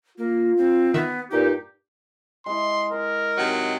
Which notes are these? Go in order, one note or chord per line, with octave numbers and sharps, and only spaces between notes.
A#3 F4
C4
D#3 B3 E5
G2 A#2 D#4 G4
G#3 E4 C6
A#4 A#5
C3 D#3 F#3